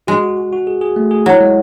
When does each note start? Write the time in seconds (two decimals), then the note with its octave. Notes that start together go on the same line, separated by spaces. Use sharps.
0.07 G#3 F#4
0.23 F#4
0.37 F#4
0.53 F#4
0.67 G#4
0.81 G#4
0.96 A3
1.11 G#4
1.26 F#3 E4
1.41 G#3